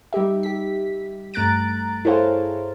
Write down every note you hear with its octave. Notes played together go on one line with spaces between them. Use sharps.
G3 D#4 G4 E5
G4 B6
G2 A3 A#5 F#6 A6 D7
E4 G#4 A4 C5 C#5 F5